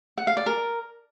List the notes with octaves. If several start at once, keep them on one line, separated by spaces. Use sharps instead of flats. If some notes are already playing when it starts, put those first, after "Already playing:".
F#5
F5
D5
A#4